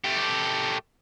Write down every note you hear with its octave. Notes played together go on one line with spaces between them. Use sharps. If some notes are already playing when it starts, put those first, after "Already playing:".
A3 G4